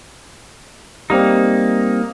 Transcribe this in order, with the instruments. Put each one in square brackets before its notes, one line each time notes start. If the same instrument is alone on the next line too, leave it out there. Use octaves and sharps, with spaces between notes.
[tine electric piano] G3 C4 [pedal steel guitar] A#3 D#4